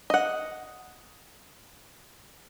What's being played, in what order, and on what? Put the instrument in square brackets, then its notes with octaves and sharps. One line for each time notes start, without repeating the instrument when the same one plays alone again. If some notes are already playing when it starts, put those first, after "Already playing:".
[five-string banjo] D#5 F#5